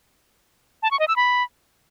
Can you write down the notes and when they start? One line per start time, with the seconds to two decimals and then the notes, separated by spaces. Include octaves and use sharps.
0.83 A5
0.91 C#6
0.99 D#5
1.08 E6
1.16 B5